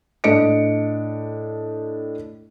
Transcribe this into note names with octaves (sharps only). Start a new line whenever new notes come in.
A2 D4 D#5 C#7 D7